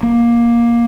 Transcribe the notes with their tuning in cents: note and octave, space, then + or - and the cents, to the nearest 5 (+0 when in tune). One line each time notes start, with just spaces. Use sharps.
A#3 +15